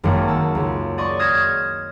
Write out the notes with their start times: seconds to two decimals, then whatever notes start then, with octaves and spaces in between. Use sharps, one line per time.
0.04 G#1 F#2 D#3 G#3 A#3 F#5
0.28 A5 E6
0.55 C#2
0.98 D5 D#5 C6 C#6
1.19 D#6 F6 G#6 A#6 C7 E7